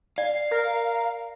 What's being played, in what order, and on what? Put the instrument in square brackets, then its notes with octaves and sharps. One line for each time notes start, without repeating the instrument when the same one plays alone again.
[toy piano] D5 [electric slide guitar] F5
[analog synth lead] A#4